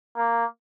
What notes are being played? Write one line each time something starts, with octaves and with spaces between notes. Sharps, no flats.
A#3